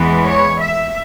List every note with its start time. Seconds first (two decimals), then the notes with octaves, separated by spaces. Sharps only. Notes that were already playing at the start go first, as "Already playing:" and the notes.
Already playing: E2 E3 G#3 B3
0.24 C#5
0.60 E5